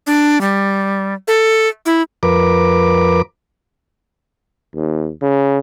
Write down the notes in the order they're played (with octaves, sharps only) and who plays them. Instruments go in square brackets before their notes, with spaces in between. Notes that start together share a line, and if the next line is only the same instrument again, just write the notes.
[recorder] D4
G3
A4
E4
[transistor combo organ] F2 A#4 B4 D6
[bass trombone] D#2
C#3